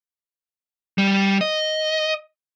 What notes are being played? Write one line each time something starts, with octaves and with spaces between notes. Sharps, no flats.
G3
D#5